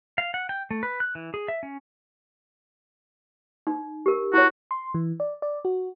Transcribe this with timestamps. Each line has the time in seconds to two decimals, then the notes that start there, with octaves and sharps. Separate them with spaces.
0.18 F5
0.34 F#5
0.49 G5
0.71 A3
0.83 B4
1.00 F#6
1.15 E3
1.34 G#4
1.48 E5
1.63 C#4
3.67 D#4
4.06 G4 A#4
4.34 E4 F#4 C#5
4.71 C6
4.94 E3
5.20 D5
5.42 D5
5.65 F#4